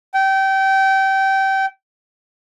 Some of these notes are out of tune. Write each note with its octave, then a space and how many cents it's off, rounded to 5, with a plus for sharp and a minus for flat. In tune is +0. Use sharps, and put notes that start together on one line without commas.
G5 -25